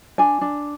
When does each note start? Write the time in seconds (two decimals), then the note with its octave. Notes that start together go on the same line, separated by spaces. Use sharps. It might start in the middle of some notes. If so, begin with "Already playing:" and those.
0.18 D4 G#5
0.41 D4